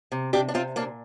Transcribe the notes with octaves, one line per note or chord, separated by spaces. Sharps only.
C3
C3 D4 G4
D4
C3 C4 F4
A#2 A#3 D4